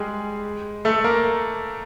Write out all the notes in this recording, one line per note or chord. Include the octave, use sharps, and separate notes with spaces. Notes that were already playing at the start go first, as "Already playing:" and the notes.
Already playing: G3 G#3 G4 G#4
A3 A4
A#3 A#4